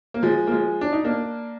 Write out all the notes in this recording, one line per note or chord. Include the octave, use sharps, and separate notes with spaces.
A#3
F3 G#3
A#3
F3 G#3
D4
D#4
A#3 D4